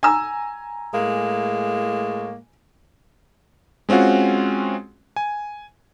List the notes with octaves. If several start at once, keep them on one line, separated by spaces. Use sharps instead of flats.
G#5 A#5 E6
A2 G#3 A#3
G#3 C4 C#4 F4 F#4
G#5